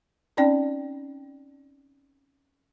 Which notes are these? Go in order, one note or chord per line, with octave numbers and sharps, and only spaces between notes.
C4 C#4 D#4 D5 G5 A5